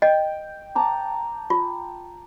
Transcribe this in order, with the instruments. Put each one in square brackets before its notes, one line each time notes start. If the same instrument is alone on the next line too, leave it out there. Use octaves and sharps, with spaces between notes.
[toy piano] D#5 [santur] G5
[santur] A5 A#5 D6
[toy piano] F4